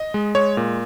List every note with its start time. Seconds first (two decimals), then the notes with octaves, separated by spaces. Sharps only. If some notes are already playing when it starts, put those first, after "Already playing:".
Already playing: D#5
0.14 G#3
0.35 G#3 C#5
0.57 A#2